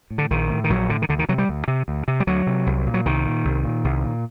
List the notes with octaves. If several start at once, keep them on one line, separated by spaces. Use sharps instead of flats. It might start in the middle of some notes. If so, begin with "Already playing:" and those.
A2
D3
A#1 D#3
A2
D#3
A#1 F#3
A2 D3
D#3
D2 D3
D#3
C3 F#3
G3
D2
C3
D2
C3
G3
D2 F#3
C3
C2
A#2
F#3
C2 D#3
A#2
C2
A#2
C2
A#2